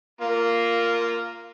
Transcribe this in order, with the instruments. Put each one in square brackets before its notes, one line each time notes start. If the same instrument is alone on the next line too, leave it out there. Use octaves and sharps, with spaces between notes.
[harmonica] A#3 F4